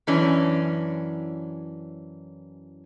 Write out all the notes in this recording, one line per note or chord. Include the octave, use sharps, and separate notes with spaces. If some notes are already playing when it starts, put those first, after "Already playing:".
F#2 E3 C#4 D4